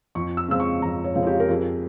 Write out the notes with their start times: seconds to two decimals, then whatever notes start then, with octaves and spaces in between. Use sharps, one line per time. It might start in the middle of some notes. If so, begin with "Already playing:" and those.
0.15 F2 C#6
0.37 E6
0.48 C#3 F3 G#3 C4 E6
0.60 C#6
0.82 F2 A#5
1.04 C#5
1.15 C#3 F3 G#3 C4
1.23 G#4
1.27 G4
1.40 A#4
1.49 F2 G#4